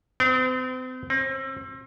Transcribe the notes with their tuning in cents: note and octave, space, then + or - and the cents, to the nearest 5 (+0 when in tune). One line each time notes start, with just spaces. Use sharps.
C4 -40
C4 +35